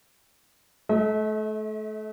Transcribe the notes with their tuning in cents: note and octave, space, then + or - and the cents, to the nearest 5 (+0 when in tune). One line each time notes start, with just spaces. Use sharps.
A3 -30 D#5 +45